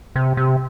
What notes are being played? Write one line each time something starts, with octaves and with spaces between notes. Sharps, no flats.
C3
C3